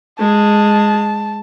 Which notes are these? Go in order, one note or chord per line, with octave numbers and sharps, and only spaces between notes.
G#3 G#4 A5